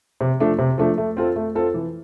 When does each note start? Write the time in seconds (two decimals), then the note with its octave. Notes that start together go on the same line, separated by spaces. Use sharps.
0.21 C3
0.40 F3 A3 D4
0.59 C3
0.78 F3 A3 D4
0.98 A3
1.17 C4 F4 A4
1.36 A3
1.55 C4 F4 A4
1.74 E3